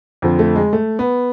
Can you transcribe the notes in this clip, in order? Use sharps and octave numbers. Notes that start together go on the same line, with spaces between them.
F2 D3 F3
A3
G#3
A3
B3